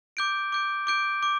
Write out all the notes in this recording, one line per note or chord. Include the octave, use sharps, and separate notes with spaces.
D6 G6 D7
D6 G6 D7
D6 G6 D7
D6